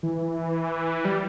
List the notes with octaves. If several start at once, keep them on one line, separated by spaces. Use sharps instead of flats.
E3
G3